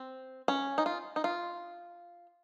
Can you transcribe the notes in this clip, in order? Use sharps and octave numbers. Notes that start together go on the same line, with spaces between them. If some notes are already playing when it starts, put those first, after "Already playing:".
Already playing: C4
C#4
D#4
F4
D#4
F4